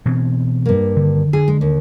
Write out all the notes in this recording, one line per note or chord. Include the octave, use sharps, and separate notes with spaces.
B2 E3 C4
G2 A#3
D3 D#3
D3 G#4
G#3
D#2